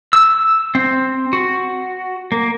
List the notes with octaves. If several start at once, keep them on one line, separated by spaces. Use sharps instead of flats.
E6
C4
F#4
A#3